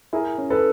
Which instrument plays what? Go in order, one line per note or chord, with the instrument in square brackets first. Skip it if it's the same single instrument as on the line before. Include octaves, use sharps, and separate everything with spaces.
[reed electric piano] E4 [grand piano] G#4 A#4
[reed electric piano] C#4
[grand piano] A4 B4